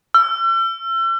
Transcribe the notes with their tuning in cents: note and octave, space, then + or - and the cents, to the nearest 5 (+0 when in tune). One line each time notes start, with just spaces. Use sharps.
E6 +40